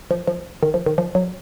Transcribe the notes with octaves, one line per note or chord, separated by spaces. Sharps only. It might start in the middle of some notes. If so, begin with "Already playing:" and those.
F3
F3
D#3
F3
D#3
F3
F#3